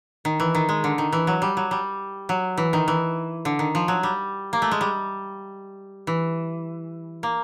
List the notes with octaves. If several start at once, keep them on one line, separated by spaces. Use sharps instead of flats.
D#3
E3
D#3
G#3
D3
D#3
E3
F#3
G3
F#3
G3
F#3
E3
D#3
E3
D3
D#3
F3
F#3
G3
A#3
A3
G#3
G3
E3
A#3